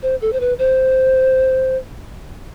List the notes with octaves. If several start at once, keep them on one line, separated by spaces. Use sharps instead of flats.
C5
A4
C5
B4
C5